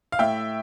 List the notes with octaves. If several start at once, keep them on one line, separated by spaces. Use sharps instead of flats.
F5
A2 E5 G5